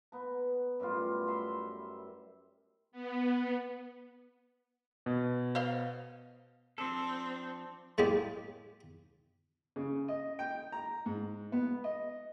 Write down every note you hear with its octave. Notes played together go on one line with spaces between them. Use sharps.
B3 A#5
F#2 A2 G3 F4
E5 A#5 C6
B3
B2
C5 D#5 F5
F3 C4 D4 A4
A2 G#3 A#3 G4
C#3
D#5
G5
A#5
G#2
B3
D#5